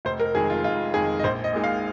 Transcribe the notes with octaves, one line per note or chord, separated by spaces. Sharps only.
F1 C5
A#4
F2 D#3 G#3 G#4
F4
F1 F4
F2 D#3 G#3 G#4
D#5
A#1 C5
D#5
A#2 G#3 D#4
F5